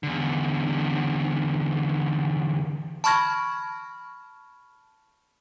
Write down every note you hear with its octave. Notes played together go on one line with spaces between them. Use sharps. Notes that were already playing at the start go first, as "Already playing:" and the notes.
E2 D3
A5 B5 C#6 F6 G#6 A#6